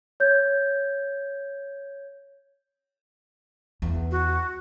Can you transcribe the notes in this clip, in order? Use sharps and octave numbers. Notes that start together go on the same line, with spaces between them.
C#5 G6 G#6
E2
F#4